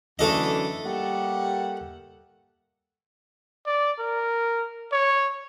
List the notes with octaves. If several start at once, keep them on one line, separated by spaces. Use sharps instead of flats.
F#2 D3 E3 A3 A4 D#5
G3 A#3 F#5
D5
A#4
C#5